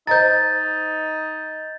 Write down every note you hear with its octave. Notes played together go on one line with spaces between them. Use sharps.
D#4 C5 D#5 A#5 G6 A6